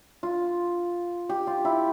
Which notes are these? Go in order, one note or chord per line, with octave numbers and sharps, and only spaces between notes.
F4
G4
F4
E4